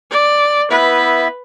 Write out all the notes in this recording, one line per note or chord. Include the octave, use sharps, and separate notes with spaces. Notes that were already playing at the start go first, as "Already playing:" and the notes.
D5
B3 E4 B4 E5